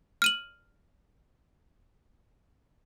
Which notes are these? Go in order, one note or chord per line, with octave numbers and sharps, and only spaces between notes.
F6 D#7 F#7